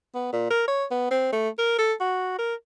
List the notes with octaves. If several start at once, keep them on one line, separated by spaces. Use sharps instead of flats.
B3
A#2
A#4
C#5
B3
C4
A3
A#4
A4
F#4
A#4